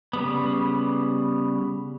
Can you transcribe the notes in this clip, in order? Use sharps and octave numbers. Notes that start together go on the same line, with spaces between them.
C#3 G3 B3